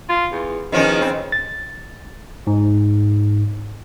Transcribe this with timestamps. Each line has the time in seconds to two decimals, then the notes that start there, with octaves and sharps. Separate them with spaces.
0.10 F4
0.32 E2
0.72 E2 D#3 F3 C#4
1.01 C#3 C4
1.32 A6
2.47 G#2